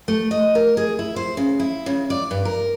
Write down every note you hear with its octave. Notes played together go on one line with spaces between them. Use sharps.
A3
D#5
A#4
G#4
E4
C5
C#3
E4
C#3
D5
G2
A#4